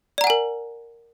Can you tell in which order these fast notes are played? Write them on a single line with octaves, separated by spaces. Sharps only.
D5 A#5 F#5 G#5 A#4